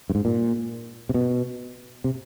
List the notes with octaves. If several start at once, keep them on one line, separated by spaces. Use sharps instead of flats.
G2
G#2
A#2
C3
B2
C3